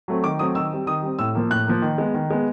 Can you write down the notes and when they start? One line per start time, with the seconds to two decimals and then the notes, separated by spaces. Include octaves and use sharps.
0.08 F#3 A3 C4
0.24 D#3 D6
0.39 F#3 A3 C4 D#6
0.55 D#3 E6
0.72 G3 C4
0.87 D#3 D#6
1.03 G3 C4
1.19 A2 E6
1.35 F3 A#3
1.51 A2 F#6
1.67 F3 A#3
1.82 D#3
1.98 G#3 B3
2.14 D#3
2.30 G#3 B3